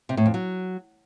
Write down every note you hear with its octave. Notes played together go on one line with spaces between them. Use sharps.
C3
A2
F2
F#3